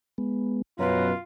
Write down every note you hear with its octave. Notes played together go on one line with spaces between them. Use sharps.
G#3 B3
F#2 B2 F4 B4 C#5 A#5